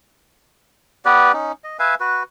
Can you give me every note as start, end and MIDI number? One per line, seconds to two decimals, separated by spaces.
1.05 1.32 59
1.05 1.32 67
1.05 1.32 71
1.05 1.32 74
1.34 1.52 61
1.34 1.52 63
1.64 1.77 75
1.79 1.95 71
1.79 1.95 76
1.79 1.95 77
1.79 1.95 80
2.00 2.23 66
2.00 2.23 71